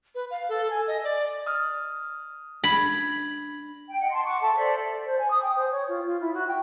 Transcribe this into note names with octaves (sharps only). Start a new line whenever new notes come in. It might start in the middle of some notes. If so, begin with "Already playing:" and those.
B4
F5
A4
G#5
D#5
D5
D#6 F6
D4 B5 G#6 A#6
G5
D#5 F#5
A5 C6
F#5 C#6 D6
A4 E5 A5
A4 C5 D5 E5
C5
G#5
D#6
G5
C5
C#5
F4
F4
E4
F#4
G5